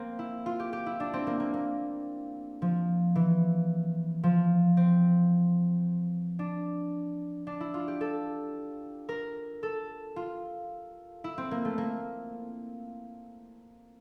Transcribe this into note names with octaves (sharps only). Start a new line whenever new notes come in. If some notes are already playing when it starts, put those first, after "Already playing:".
Already playing: A#3 C4
E4
F4
G4
G4
E4
D4
C4
A#3
A#3
A#3
F3
E3
F3
C4
D4
D4
E4
F4
G4
A4
A#4
A4
F4
E4
C4
A#3
A3
A#3